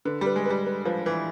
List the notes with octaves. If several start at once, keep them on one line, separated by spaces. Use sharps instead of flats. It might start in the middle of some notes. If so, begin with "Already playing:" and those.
D3 B4
G3 B4
G#3
G3 B4
B4
F3 B4
E3 B4